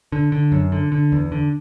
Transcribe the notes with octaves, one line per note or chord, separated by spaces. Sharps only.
D3
D3
F#2
D3
D3
E2
D3